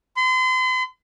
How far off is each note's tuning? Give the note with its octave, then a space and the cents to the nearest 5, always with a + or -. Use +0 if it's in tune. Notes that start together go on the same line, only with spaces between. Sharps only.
C6 -40